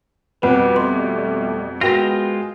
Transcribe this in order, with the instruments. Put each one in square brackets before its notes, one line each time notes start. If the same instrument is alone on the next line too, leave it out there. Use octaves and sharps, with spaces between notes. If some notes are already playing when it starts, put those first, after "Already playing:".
[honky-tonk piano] F2 B2 [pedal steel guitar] G3 [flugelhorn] B4 [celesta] F#5
[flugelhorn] A3 [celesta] C6
[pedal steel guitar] G#3 F4 [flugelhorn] B3 [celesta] F#4 A#4 [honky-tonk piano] G5 A#6